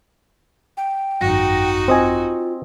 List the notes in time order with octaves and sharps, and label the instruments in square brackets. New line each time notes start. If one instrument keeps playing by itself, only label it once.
[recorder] G5
[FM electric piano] G#1 F#2 A#6 [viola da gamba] D#4 F#4
[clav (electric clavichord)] C4 D#5 G#5 [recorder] F4